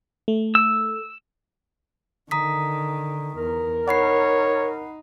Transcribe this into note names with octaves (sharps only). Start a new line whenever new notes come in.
A3
E6
D3 D#3 A#5 D#6 B6
E2 A#4
D#4 C#5 F#5 B5 C7